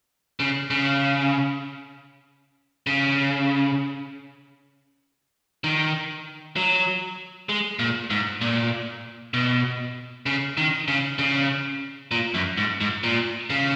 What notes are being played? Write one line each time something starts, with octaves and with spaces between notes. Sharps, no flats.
C#3
C#3
C#3
D#3
F#3
G#3
A#2
G#2
A#2
B2
C#3
D#3
C#3
C#3
A#2
F#2
G#2
G#2
A#2
C#3